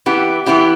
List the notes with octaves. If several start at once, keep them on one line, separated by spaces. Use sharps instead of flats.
E3 B3 E4 G4
E3 B3 E4 G4